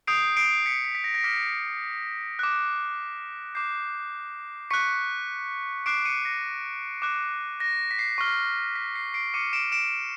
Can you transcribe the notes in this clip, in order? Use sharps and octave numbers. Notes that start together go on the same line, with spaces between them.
D#6 G6 C7 D7
C7 D7
B6 C#7
B6
B6
A#6
A#6
D6 F6 B6
D6 F#6
D6 G6 C7
C#6 F#6 B6 C#7
D6 F#6 C7 D7
C#7 D#7
A#6
D6 F#6
A#6
B6
C7
C#6 F6
B6
C7
C7 D7
D6 F6 C#7 D#7
D7 E7
D7 E7